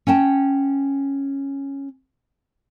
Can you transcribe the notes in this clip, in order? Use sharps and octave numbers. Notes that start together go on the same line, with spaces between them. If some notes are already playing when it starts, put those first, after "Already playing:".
C#4 F#5 G5 A5